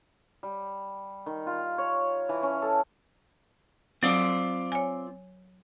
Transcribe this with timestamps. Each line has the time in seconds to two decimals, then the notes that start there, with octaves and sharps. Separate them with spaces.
0.43 G3
1.26 D#3
1.47 F4
1.78 C#5
2.29 E3
2.43 C#4
2.62 A4
4.03 F#3 C4 F4 D5 D#6
4.72 C#5 G#5